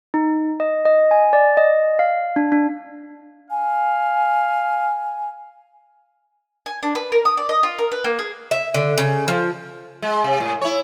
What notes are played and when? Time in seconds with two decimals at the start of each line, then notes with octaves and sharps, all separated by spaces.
0.14 D#4
0.60 D#5
0.85 D#5
1.11 G#5
1.33 D5
1.57 D#5
1.99 F5
2.36 D4
2.52 D4
3.51 F5 G#5
6.66 G#5
6.83 D4
6.95 B4
7.12 A#4
7.25 D#6
7.37 D5
7.49 D#5
7.63 F4
7.79 A#4
7.92 B4
8.04 A#3
8.19 G#4
8.51 E5
8.74 D3
8.98 C#3
9.28 F3
10.02 G#3
10.24 C3
10.40 A2
10.61 E4 C#5